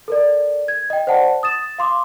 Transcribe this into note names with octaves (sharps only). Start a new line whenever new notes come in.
A4 A#4 D5
G#6
D#5 G5
C5 D5 F#5 A5
D#6 A6 E7
F5 C6 D6